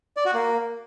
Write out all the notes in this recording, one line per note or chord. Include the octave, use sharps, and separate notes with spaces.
D5
F#4
A#3